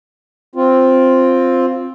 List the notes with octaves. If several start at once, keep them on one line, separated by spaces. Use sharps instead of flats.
C4 F4